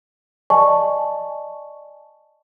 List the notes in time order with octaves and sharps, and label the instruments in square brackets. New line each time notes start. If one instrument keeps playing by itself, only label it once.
[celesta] D5 D#5 G#5 A5 C#6